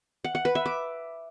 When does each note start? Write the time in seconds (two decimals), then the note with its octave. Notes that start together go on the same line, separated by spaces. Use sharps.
0.24 F#5
0.35 F#5
0.45 B4
0.55 E5
0.66 D6